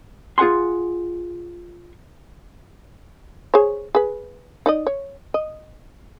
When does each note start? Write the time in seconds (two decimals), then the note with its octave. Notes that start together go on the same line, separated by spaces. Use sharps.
0.38 F4 G#4 F#5 G#5 C6
3.54 G#4 C5 C#5
3.95 G#4 B4
4.66 D#4 D5 D#5
4.87 C#5
5.34 D#5